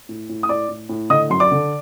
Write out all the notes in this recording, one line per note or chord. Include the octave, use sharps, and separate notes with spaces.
A2
A2
D#6
A2 D5 D6
A2
A2
D3 D#5 D#6
F#2 C6
D5 D6
D3